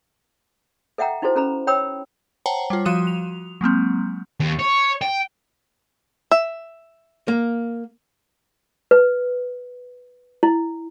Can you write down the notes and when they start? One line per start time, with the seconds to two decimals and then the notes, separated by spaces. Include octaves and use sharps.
0.98 A4 E5 F#5 G5 A#5
1.22 D#4 E4 F#4 A4 C5
1.35 C#4 A4 A#5 B5
1.67 C#5 G5 B5 D#6 E6
2.46 C5 C#5 F#5 G5 A5 A#5
2.70 G3 F4
2.85 F3 F#4 D#6 D#7 E7
3.07 F7
3.61 F#3 G#3 A#3 C4
4.40 D#2
4.59 C#5
5.02 G5
6.31 E5
7.28 A#3
8.91 B4
10.43 E4